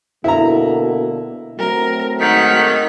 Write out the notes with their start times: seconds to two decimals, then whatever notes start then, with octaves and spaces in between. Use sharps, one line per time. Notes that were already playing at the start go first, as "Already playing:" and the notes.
0.24 B2 D3 A#3 E4 A#5
1.59 F#3 A3 C4 A#4
2.20 G#2 D#3 F#5 B6